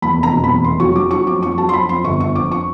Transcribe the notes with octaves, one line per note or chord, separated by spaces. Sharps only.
E2 B5
F1
A#5
B2
B5
E2
F1 C6
F#3 C#6
F#3 D6
F#3 C#6
F2 D6
F2 C#6
F#3 A5
C6
F2 B5
F2 C6
G1 C#6
G1 C#6
F2 D6
C#6